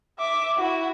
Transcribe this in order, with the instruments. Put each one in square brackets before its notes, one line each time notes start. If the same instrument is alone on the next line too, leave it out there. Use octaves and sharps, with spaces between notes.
[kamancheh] E5 D6
E4 F#4